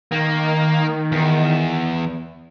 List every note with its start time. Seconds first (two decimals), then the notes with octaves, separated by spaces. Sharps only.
0.12 D#3 A#3
1.12 E2